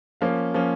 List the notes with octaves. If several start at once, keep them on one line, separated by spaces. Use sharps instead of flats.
F3 A#3 C#4 F5
F3 A#3 C#4